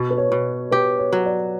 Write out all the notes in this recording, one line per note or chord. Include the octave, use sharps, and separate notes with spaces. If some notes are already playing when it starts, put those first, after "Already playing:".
Already playing: B2
B4
C#5
B2
G4 B4
C#5
F#3
D5